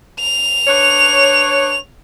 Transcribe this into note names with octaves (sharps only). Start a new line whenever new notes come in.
F7
D4 B4 C#5